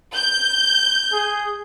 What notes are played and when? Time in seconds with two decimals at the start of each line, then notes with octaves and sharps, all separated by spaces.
0.14 G6
1.12 G#4